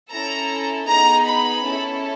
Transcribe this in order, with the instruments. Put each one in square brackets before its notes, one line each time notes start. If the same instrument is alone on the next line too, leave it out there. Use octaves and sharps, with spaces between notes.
[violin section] C#4 E4 A4 A#5
B3 D#4 G#4 A#5
B5
C#4 E4 A4